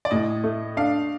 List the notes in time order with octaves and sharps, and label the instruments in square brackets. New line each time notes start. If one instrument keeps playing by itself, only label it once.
[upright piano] D5
[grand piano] A2 [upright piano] D#5
[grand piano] A3
[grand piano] D4 [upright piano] F5